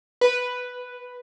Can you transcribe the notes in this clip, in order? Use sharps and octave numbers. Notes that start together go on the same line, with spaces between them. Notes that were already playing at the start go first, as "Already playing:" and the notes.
B4